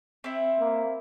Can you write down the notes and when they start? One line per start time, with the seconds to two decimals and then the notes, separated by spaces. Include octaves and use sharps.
0.24 C4 E4
0.59 A#3